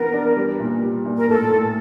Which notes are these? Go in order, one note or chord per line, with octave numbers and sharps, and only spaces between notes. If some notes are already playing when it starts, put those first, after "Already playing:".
Already playing: E3 B3 D4 A#4
D4
G3
A#2
G3
A#2
A#4
A2 A4
A2